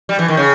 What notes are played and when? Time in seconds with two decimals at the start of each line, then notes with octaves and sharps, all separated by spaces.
0.09 G3
0.19 E3
0.28 D#3
0.37 C#3